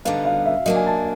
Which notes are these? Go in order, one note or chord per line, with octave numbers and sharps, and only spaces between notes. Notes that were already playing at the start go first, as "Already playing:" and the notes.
D3 G3 B3 D#4 F5
F5
E5
F#3 A#3 D4 D#5
G#5
A5